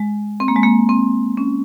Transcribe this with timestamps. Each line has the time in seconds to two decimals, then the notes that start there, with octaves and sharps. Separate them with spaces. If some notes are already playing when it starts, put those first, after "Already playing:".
Already playing: G#3
0.40 C4
0.48 A#3
0.56 G#3
0.63 A#3
0.89 C4
1.37 C#4